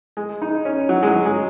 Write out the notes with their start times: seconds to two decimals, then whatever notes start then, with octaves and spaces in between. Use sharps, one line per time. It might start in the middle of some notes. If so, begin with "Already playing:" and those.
0.17 G#3
0.42 D#4
0.65 C#4
0.89 F#3
1.03 G#3
1.07 F#3
1.26 G#3